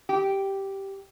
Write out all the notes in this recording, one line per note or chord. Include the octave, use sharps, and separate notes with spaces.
G4